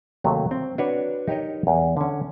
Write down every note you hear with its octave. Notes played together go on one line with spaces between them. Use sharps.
D#2 C3 F#3 A3
C4
D4 F#4 B4 C#5
D#4 G4 A#4 C#5 D#5
E2
D3 C#4